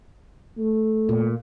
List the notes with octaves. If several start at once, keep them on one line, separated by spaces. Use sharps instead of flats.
A3
A#2